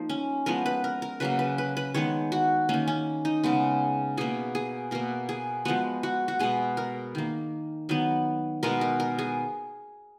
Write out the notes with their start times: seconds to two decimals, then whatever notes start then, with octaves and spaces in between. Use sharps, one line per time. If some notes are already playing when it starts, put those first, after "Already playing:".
Already playing: F3 A#3 D#4
0.09 C#4
0.46 F3 G#3 B3 A#4
0.66 B4
0.84 A#4
1.02 A#4
1.20 C#3 F#3 A#3 B4
1.39 B4
1.58 B4
1.77 B4
1.94 D#3 G#3 B3 C#5
2.32 F#4
2.69 D#3 A#3 C#4
2.88 C#4
3.25 D#4
3.44 C#3 G#3 B3
4.17 B2 A#3 G#4
4.55 G#4
4.91 B2 A#3 A#4
5.29 G#4
5.65 F3 G#3 B3 F#4
6.03 F#4
6.28 F#4
6.39 B2 G#3 B3 G#4
6.77 A#4
7.15 D#3 A#3
7.89 D#3 F#3 B3
8.63 B2 G#3 B3 A#4
8.81 A#4
9.00 A#4
9.19 G#4